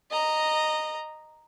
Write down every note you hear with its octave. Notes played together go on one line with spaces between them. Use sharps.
D#5 A#5